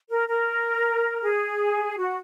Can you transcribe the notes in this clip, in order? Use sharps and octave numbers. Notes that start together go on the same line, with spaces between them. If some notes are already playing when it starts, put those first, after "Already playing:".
A#4
A#4
G#4
F#4